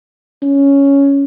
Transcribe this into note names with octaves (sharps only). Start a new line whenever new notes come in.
C#4